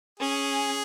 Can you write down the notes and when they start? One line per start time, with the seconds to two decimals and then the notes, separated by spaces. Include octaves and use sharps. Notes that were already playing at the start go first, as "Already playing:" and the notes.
0.19 C#4 G#4